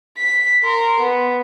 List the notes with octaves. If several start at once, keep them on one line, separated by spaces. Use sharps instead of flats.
B6
A#4 C6
B3